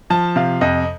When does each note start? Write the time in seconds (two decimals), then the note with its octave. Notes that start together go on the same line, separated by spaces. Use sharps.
0.10 F3 A5
0.36 C3 F5
0.61 F2 D#5